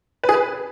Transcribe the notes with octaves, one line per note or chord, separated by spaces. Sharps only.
B4
G#4
B4